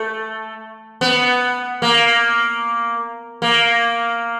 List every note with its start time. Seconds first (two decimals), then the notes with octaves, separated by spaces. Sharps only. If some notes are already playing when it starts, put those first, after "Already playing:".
Already playing: A3
1.01 B3
1.82 A#3
3.42 A#3